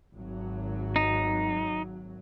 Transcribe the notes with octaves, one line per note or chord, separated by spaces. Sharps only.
G#1 F#3
D#4